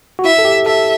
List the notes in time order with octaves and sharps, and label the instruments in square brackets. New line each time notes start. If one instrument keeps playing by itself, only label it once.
[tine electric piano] F#4
[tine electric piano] E4 [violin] E5
[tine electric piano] A4
G4
[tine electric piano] A4 [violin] E5